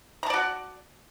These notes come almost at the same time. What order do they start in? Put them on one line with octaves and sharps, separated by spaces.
A#5 A5 D5 F#4